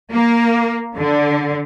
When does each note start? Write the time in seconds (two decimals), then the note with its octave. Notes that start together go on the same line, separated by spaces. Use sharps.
0.12 A#3
0.97 D3